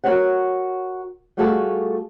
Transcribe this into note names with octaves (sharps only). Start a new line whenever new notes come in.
F#4 G4 A#4 C#5 F#5
G3 A3 F4 F#4 G#4 A4